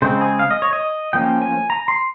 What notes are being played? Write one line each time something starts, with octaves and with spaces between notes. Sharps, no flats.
C#3 G#3 C4 C5
G#4
F5
D#5
C#5
D#5
F3 A#3 C#4 G5
G#5
A#5
C6